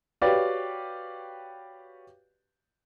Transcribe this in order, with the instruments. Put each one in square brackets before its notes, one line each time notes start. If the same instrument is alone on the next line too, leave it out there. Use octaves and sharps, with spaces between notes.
[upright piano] F#4 G4 B4 C#5 D5 F5